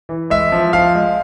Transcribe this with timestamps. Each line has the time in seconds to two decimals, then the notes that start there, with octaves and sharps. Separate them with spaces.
0.09 E3
0.30 G#3 E5
0.52 F3
0.73 F3 F5
0.95 G#3